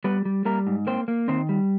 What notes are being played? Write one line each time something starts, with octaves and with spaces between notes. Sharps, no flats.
G3 B3 B4
G3
G3 A#3 A#4
G#2
A#3 C4 C5
A#3
D#3 C4 C5
G3